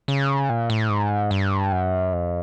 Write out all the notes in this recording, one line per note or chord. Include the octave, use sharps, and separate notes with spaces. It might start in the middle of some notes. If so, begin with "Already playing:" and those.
C#3
A#2
A2
G#2
G2
F#2
F2